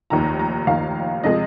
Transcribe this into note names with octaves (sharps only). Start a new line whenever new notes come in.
F1 D#2 D#3 A#5
A#5
F1 D#2 D#3 F5
C3 F3 G#3 D#5